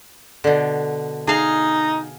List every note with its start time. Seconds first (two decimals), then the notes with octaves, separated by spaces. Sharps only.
0.44 B2 D3
1.27 D#4 G#4 F5